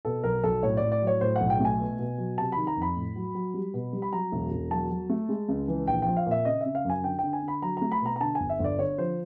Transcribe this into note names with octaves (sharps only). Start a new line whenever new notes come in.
B2 A4
B1 A#4
B1 A4
A2 C#5
A2 D5
D5
F#3
C#5
A2 C5
B1 F#5
G5
A3 G#5
B2
B2
F#3
C3 A5
D#3 B5
A#5
F2
B5
A2
F#3
F#3
G3
B2
G3
B5
F#3 A#5
E1
E1
F#3 A5
F#3
A3
G#3
C#2
E3
A#1 G5
F3 G5
F5
A#2
E5
C#3 D#5
C#3 E5
F5
F#2 G#5
D3 G5
D3 G5
G#5
D3
B5
F#3 A#5
A3 A#5
B5
B2 A#5
A#5
D3 A5
G1 G#5
E5
G1 D5
D3 C#5
F3 C5